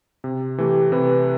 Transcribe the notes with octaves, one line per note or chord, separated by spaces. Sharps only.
C3
E3 A3 G4
C3 B4